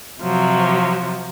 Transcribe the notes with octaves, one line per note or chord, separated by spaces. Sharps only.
C3 F3 F#3